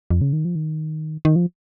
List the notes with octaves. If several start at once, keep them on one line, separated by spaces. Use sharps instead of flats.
F2
C#3
D#3
F3
D#3
D#3
F3